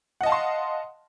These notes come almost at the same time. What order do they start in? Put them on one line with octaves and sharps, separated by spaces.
F#5 D#5 A5 F5 C6